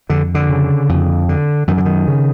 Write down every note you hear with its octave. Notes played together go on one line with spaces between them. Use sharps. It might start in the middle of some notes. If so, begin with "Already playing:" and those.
F2 D3
D3
C#3
F2
D3
F#2 D#3
D3
D#3
C#3